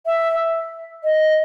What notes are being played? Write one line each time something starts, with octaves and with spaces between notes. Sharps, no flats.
E5
D#5